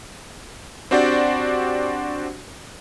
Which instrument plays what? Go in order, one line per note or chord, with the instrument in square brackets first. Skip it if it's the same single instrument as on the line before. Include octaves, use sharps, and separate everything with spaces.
[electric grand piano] C4 D4 F#4 G4 C5 D5